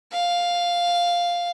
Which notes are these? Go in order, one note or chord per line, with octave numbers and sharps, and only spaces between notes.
F5